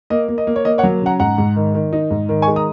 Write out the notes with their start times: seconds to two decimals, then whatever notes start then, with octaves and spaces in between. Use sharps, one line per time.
0.10 A#3 D#5
0.28 A#3
0.38 D#5
0.47 A#3
0.56 C#5
0.65 A#3 D#5
0.78 C#5 F#5
0.83 F#3
1.02 C#3 F#5 A#5
1.19 G#2 F#5 A#5
1.38 G#2
1.56 D#3
1.74 D#3
1.93 D#4
2.11 G#2
2.29 D#3
2.42 G#5 C#6
2.48 G#3
2.56 A#5 D#6